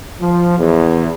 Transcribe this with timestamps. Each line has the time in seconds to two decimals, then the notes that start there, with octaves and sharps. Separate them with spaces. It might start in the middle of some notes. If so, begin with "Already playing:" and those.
0.20 F3
0.58 E2